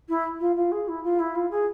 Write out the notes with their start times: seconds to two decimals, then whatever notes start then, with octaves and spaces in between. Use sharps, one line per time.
0.09 E4
0.40 F4
0.56 F4
0.72 G#4
0.88 E4
1.04 F4
1.19 E4
1.35 F4
1.51 G#4